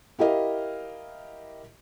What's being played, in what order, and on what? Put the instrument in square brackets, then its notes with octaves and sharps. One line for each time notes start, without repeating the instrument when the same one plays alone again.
[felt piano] E4 G4 A#4 D#5 F5